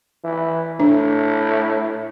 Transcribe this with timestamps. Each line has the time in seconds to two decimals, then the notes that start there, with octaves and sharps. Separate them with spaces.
0.24 E3
0.80 A2 D4